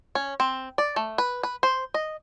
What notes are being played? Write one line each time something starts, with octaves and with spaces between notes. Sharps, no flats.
C#4
C4
D5
A3
B4
B4
C5
D#5